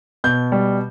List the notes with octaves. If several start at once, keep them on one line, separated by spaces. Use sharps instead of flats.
B2 G6
G3